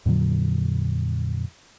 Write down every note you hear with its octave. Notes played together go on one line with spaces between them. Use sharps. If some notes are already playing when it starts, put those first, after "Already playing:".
F2 A#2 D3 F#3